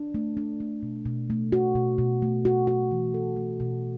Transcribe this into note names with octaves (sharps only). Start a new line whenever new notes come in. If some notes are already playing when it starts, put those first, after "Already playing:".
Already playing: D4
A3
D4
A3
B2
B2
A3
F#4
B2
B2
A3
F#4
F#4
E3
A4
A3
B2